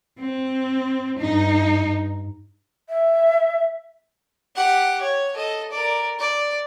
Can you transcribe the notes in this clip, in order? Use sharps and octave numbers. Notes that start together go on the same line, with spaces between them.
C4
G2 D#4
E5
G4 F#5
C#5
A4 D#5
A#4 D5
D5